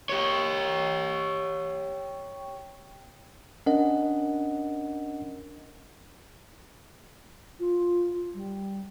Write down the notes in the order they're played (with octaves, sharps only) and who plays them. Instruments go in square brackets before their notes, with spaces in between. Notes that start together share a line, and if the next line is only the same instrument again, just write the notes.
[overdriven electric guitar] G4 C#5
[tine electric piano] C#4 D4 A#4 D#5 F#5
[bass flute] F4
G3